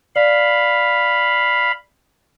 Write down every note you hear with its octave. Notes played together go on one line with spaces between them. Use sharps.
D5 F5 B5